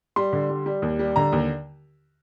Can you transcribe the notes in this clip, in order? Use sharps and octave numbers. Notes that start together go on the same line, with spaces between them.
G3 C6
D3
G3
G3
D#2
G3
D3 A#5
D#2